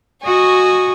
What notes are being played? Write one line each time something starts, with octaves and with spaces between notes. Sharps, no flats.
F#4 D#5 G#5 C#6